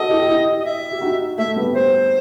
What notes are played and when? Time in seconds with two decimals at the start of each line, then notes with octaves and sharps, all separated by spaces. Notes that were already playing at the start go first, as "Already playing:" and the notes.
Already playing: F#4 A4 D#5
0.10 E4 G4
0.28 E4 G4
0.60 D#5
0.65 E5
0.92 G4
1.01 D#4 F#4
1.38 A3 E5
1.56 G3 B3
1.74 C5